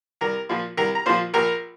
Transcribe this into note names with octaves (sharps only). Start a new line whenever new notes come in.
C2 A#4 A#5
A#2 F3
C2 A#4 A#5
A#5
A#2 F3 C5 C6
A#1 A#4 A#5